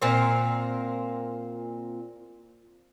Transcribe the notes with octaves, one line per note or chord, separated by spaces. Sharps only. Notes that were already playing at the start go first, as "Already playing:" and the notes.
A#2 C4 A#4